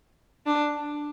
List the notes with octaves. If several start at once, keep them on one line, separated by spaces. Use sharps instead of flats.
D4